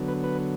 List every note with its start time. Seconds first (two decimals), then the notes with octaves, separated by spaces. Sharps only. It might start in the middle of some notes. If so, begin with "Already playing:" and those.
Already playing: D3 F#3 B3
0.08 B4
0.24 B4